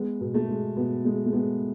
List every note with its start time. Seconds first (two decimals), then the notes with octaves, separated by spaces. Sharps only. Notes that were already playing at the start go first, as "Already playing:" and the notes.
Already playing: G#3 B3
0.21 B2
0.34 A3
0.49 G#3
0.76 B2 B3
1.05 G#3 A3
1.26 A3
1.33 G#3 B3